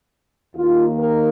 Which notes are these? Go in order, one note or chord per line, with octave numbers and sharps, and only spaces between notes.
D#2 D#3 A#3 F4
A#4